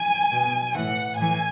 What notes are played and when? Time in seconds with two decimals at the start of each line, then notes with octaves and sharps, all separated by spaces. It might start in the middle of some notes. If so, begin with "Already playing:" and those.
Already playing: G#5
0.32 B2
0.75 A2 E3 F#5
1.17 A2 E3 G#5